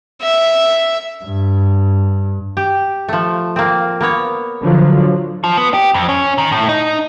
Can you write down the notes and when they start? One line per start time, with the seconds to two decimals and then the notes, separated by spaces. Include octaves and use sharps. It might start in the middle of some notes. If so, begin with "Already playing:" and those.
0.22 E5
1.24 G2
2.57 G4
3.08 F3 A3
3.56 A#3 C4
4.01 A#3 B3 C#5
4.61 D3 F3 F#3
5.44 F3
5.57 B3
5.74 G4
5.94 F2
6.09 C#4
6.38 D#3
6.52 A2
6.69 D#4